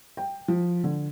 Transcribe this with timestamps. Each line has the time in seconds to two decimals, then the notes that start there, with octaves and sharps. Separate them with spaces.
0.17 G5
0.48 F3
0.84 D3